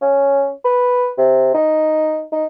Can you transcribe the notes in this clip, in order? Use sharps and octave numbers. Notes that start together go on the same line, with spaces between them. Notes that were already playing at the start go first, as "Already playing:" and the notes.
C#4
B4
C3
D#4
D#4